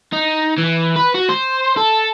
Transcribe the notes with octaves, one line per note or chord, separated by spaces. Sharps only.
D#4
E3
B4
F#4
C5
A4